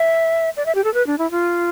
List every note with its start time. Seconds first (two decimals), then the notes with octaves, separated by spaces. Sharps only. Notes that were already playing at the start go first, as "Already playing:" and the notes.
Already playing: E5
0.57 D5
0.66 E5
0.75 G4
0.84 A4
0.94 B4
1.07 D4
1.18 E4
1.31 F4